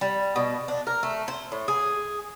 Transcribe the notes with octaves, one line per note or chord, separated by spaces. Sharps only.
G3
B2
D4
A#4
A3
C5
A2
G#4